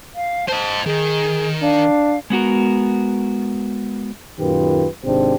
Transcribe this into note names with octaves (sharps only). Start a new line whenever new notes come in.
F5
C5 D#5 A5
D#3 G#4
D4 F5
G#3 B3 F#4 A#4
F#2 A#2 D#3 F4 G4 B4
G#1 G#2 C3 D4 G4 C5